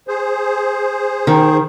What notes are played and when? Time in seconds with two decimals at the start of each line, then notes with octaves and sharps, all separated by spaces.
0.08 G#4 C5
1.27 D#3